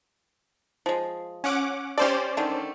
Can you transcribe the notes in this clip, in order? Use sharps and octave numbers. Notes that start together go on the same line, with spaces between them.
F3 G#3
C#4 F#5 D6
C#4 G4 A4 C5 D5
D3 D#3 A3